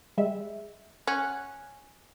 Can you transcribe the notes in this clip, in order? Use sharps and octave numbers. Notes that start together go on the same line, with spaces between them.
G3 G#3 E5
C#4 F#5 F#6 C#7